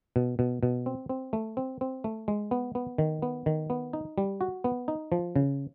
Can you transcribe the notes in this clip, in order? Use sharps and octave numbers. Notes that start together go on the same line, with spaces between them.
B2
B2
B2
C4
C4
A3
C4
C4
A3
G#3
B3
B3
D#3
B3
D#3
B3
D#4
G3
F#4
B3
D#4
F3
C#3